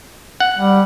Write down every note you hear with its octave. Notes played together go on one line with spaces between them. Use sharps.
F#5
G3